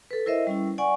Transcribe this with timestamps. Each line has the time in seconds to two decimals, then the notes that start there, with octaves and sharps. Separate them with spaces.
0.11 A4 B4
0.26 E4 A#4 C5 D#5 E5
0.47 G3 C#4 E4
0.78 D5 F#5 G#5 C#6